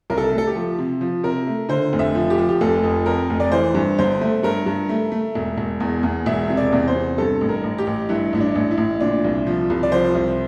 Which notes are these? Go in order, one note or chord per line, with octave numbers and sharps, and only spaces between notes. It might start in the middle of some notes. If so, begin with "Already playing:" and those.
C2 A#4
A4
A3
A4
G4
F3
C3
F3
C3 A#4
A3
D3 C5
F1
E5
F3
G4
F3
G4
F1 A4
F2
F2 A#4
F1
D5
E3 C5
G2
G1 C5
A3
G2 A#4
G2
A3
A3
E1
E1
E2
E2
E1 E5
C3
D5
E2
C5
C3
G2 A4
A1
A#4
A1
G4
A1
G2 E4
A1 E4
D4
A1
E4
A1
A#2 D4
C2
F3
C2
D5
F3 C5
C2